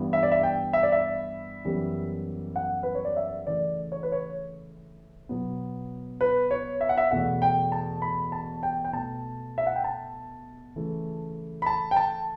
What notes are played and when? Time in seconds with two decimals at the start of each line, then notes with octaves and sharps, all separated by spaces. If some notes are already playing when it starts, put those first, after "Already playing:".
Already playing: G2 E3 B3
0.13 E5
0.23 D5
0.32 E5
0.43 G5
0.73 E5
0.83 D5
0.92 E5
1.65 F#2 E3 G3 B3
2.56 F#5
2.83 B4
2.95 C#5
3.05 D5
3.16 E5
3.47 C#3 E3 A3 D5
3.92 C#5
4.03 B4
4.12 C#5
5.29 B2 F#3 B3
6.21 B4
6.51 C#5
6.81 E5
6.89 F#5
6.98 E5
7.11 E2 B2 A3 F#5
7.42 G5
7.72 A5
8.02 B5
8.32 A5
8.63 G5
8.85 G5
8.93 B2 A3 A5
9.58 E5
9.67 F#5
9.76 G5
9.84 A5
10.76 C#3 E3 A3
11.62 B5
11.66 A5
11.91 G5
11.96 A5